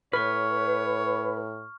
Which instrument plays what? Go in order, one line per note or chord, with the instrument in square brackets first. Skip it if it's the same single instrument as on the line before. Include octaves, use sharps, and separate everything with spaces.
[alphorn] A2 [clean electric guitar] B4 [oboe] C#5 [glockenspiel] C#6 F6